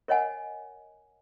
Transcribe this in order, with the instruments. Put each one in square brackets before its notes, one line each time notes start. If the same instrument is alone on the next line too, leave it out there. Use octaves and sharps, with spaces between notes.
[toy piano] A#4 C#5 D#5 F#5 G#5